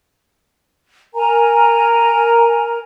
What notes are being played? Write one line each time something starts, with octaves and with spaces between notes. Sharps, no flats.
A#4 G#5 A#5